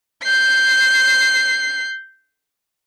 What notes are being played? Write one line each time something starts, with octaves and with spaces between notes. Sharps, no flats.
G6 C7